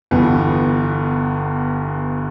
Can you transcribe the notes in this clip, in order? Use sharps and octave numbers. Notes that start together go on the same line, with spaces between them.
G1 G2 E3 B3